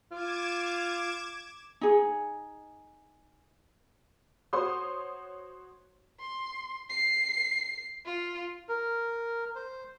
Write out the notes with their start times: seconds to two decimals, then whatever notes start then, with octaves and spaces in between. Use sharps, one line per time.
0.12 F4 D6 G#6 E7
1.81 D#4 G#4
4.53 F#4 C5 C#5 C6 D#6
6.20 C6
6.89 C7
8.05 F4
8.68 A#4
9.55 C5